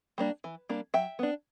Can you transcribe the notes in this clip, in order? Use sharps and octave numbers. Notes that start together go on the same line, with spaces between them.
G3 A#3 D4
E3
G3 A#3 D4
F#3 E5 G5
B3 D4